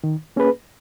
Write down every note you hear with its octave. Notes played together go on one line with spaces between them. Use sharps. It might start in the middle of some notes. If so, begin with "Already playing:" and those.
D#3
A#3 C#4 G#4 B4